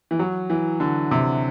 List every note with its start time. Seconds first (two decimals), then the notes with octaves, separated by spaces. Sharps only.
0.11 E3
0.19 F#3
0.50 E3
0.80 D3
1.11 C3